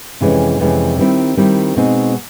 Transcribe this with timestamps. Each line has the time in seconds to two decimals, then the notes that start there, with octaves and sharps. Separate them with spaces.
0.21 F2 C3 E3 G#3 C#4
0.60 F2 C3 E3 G#3 C#4
0.98 D#3 G3 C4 E4
1.37 D#3 G3 C4 E4
1.76 B2 G#3 C4 D#4